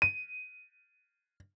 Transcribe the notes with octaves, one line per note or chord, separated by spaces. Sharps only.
D#7